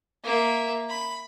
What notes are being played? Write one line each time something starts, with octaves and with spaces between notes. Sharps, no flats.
A#3 E5
B5